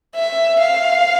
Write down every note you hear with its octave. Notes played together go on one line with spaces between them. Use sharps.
E5
F5